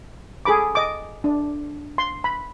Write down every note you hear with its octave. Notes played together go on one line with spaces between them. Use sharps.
G#4 A4 B5 D6
D#5 D6
D4
C6
B5